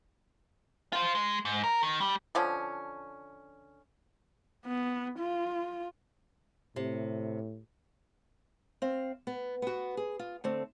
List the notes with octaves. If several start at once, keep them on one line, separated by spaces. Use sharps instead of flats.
F4 C5
G#3
G#2
A#4
D#3
G3
D3 F3 C#4
B3
F4
A2 C3
C4 F5
B3
B3 F#4
G#4
F4
D3 A3 C4